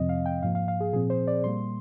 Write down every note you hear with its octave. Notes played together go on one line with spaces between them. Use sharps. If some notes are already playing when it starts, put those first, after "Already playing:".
Already playing: F2 C3 F3 C4 D#5
F5
G5
G#2 F3 A#3 F5
F5
F5
G#4
A#2 F3 C4 G#4
C5
D5
A#2 G3 A#3 C6